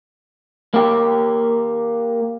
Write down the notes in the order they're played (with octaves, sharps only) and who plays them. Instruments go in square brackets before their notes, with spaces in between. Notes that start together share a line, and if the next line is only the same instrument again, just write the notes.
[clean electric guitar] A#3 G4